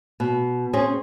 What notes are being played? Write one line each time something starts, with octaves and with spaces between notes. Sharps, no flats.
B2
C4 C#4 G#4